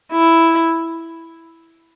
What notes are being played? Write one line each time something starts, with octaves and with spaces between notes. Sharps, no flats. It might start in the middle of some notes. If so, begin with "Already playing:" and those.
E4